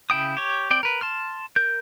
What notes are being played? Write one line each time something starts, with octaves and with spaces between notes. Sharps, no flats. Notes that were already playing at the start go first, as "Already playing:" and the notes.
C#3 E4 G5 D#6
G4 C#5
C4 D5 G5
A#4 B4
A5 C6 F6
A#4 G6